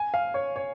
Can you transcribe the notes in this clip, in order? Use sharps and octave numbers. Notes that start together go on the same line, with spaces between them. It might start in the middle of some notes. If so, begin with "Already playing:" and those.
Already playing: G#5
F5
C#5
C#5